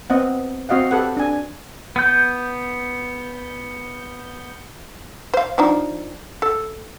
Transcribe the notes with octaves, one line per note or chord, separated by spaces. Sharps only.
B3 C4 D#5 F#5
C4 F#4 D#5 F5 F#5
G4 A4 B4 F#5
D4 G#5
B3 G6
C5 F5
F3 D4 D#4
A4